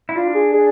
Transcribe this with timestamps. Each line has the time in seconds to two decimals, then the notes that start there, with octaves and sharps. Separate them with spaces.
0.09 E4
0.16 D4 F4
0.30 F4
0.35 G#4
0.53 G#4